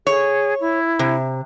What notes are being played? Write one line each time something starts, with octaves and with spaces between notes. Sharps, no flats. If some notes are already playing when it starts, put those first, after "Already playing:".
G#4 C#5
E4
C3